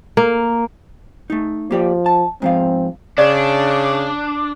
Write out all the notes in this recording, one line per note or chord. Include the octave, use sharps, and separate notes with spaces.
A#3
A3 D#4
F3 A#3 G4 D5
A5
G#2 F3 C4 F5
C#3 D4 D5